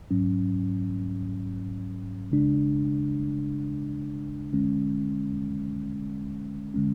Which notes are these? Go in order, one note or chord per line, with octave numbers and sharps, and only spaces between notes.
G#2 F#3 C#4
C#3 G#3 D4
D3 G#3 C#4
D3 G#3 C#4